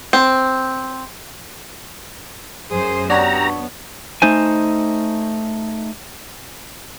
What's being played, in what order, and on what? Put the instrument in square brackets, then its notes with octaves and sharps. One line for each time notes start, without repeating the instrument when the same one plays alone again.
[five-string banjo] C4
[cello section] F#2 C5 [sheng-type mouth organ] G#4 D#6
[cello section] B3 [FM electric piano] D4 F#4 C#5 [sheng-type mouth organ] G4 F#5 E6 [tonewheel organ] A#5
[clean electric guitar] A3 D#4 C5 G#5